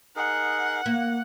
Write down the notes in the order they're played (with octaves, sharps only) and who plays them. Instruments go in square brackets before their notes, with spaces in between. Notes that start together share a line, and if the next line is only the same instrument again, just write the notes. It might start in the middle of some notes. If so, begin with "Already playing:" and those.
[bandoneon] D#4 G#4 A#4 [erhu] F#5
[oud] A#3